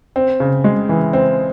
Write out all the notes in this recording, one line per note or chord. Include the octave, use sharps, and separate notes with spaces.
C4
C#3
G#3
E3
C4